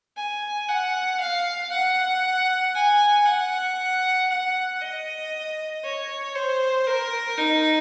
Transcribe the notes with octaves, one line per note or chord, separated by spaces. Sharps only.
G#5
F#5
F5
F#5
G#5
F#5
F#5
D#5
C#5
C5
A#4
D#4